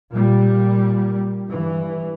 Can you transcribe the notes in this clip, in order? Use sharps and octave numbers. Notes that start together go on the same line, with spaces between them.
A#2 G3
G2 E3